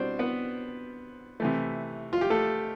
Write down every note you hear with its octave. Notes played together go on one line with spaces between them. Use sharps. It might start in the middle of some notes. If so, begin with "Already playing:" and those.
Already playing: B2 G3 C4 D4 C5
B3 B4
C3 E3 A3
F4
G4
A3 A4